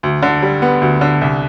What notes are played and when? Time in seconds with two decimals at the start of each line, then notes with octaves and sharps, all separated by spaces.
0.03 D2
0.23 D3
0.42 G3
0.62 B3
0.82 D2
1.01 D3
1.22 C2